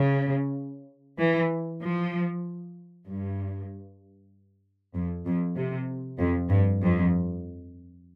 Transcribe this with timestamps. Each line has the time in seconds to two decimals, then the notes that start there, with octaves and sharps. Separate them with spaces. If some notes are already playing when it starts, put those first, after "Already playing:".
Already playing: C#3
1.19 E3
1.81 F3
3.06 G2
4.95 F2
5.26 F2
5.56 C3
6.19 F2
6.50 G2
6.83 F2